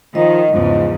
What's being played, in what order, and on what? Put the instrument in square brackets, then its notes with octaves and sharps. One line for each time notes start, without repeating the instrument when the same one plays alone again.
[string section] D#3 [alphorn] F3 [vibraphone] D#5
[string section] E2 G#2 C#3 [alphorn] F3